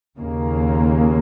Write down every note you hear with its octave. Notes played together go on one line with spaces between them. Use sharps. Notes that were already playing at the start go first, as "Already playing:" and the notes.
D#2 C#3 A#3